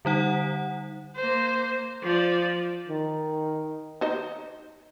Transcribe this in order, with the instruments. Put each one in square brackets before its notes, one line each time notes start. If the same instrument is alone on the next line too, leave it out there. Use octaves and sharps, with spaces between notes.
[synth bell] D3 G3 D#4 F#5
[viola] A#3 C5
F3 D5
[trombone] D#3
[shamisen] D#4 C5 D#5